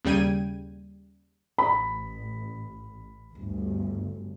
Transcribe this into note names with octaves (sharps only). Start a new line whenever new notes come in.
D#2 C#3 G3 G5 G#6 D#7
A1 B5
G1 D2